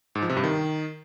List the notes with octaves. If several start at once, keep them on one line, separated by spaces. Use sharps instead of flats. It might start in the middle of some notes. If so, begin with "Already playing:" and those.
G#2
F3
C3
G2
D#3